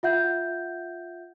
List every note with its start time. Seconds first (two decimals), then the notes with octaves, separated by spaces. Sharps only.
0.03 F4 E5 F#5 G6